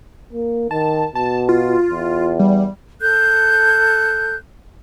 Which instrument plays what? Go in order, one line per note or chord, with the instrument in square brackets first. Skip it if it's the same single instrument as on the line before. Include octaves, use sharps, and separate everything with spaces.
[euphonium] A#3
[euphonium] D#3 [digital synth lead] A5
[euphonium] B2 [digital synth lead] A5
[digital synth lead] F4
[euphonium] E2
[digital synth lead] G3
[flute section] A4 F#6 G6